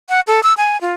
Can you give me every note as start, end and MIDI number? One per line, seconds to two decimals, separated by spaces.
0.09 0.20 78
0.27 0.42 69
0.43 0.53 88
0.57 0.80 80
0.81 0.95 65